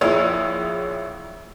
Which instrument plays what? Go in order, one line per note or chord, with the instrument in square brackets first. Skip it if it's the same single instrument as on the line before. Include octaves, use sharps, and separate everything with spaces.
[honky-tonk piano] A#1 E4 F4 G#4 C#5